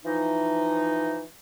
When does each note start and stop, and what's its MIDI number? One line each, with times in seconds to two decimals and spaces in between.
0.05 1.23 52
0.05 1.23 53
0.05 1.23 63